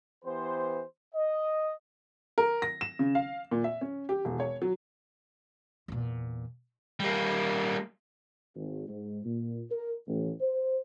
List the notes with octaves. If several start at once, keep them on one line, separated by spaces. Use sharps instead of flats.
E3 B3 G4 C5
D#5
A#4
A#6
E7
C#3
F5
A#2
E5
C#4
G4
E1
C#5
F#3
E2 A#2
G3 A#3
G#1
G#2
A#2
A#4
A1
C5